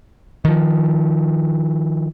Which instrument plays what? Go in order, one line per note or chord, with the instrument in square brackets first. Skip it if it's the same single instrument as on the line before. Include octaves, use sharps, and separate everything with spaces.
[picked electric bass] D#3 F3